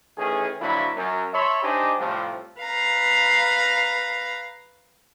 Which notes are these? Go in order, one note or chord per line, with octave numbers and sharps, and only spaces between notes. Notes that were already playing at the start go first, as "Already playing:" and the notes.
D#3 E3 A3 C#4 G#4
D3 F3 F#3 A#3 E4 B5
F#2
C#5 E5 A5 B5 C6
D4 D#4 G4 C5 D#5 G#5
A2 C3 F3 G3 A3 F4
B4 F5 A#5